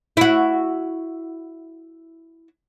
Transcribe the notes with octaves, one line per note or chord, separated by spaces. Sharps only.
E4 F#4